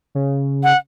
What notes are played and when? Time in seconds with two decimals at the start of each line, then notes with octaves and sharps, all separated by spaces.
0.15 C#3
0.64 F#5